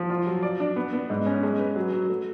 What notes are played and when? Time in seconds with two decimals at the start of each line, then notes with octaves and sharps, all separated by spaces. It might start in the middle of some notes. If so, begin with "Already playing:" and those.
Already playing: F3
0.10 F4
0.27 F#3
0.43 D5
0.60 D4
0.76 B3
0.93 B3
1.10 G#2
1.26 C#4
1.43 G#3
1.59 B4
1.76 F#3
1.92 F#3
2.09 A3